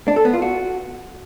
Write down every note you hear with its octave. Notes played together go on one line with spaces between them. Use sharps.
D4
A4
B3
F4
F#4